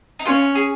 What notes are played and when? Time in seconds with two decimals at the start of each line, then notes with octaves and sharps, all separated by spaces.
0.19 D#4
0.25 C#4 F4
0.55 G#4